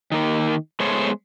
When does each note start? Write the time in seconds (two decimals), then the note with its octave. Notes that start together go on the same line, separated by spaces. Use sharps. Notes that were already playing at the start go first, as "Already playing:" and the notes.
0.12 D#3 A#3
0.80 G#3 A3 B3 C5 C#5